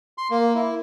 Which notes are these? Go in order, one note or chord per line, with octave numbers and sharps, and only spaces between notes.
C6
A#3
E4